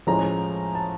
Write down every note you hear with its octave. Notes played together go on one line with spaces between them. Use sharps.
A2 F3 G#3 C#4 A#5
A5